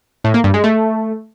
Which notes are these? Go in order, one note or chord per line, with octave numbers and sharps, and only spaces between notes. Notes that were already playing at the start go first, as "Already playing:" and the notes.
A2
A#3
G2
G#3
A3